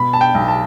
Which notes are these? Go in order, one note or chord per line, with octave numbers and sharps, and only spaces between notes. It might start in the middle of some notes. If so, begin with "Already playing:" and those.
Already playing: B2 B5
A5
G5
B1
A5